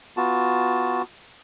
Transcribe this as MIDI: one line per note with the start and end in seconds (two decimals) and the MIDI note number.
0.17 1.02 59
0.17 1.02 65
0.17 1.02 66
0.17 1.02 81